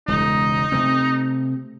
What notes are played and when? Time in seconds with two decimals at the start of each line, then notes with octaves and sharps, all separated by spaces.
0.08 E1 C#2 D#4
0.72 C3 A3 C4